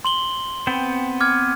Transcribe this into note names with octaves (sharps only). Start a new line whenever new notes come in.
C6 F#7 G7
B3 C4 G5
D6 F6 G#6